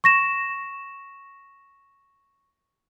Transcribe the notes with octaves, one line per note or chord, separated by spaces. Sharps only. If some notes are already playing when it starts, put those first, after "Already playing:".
C#6 A#6 E7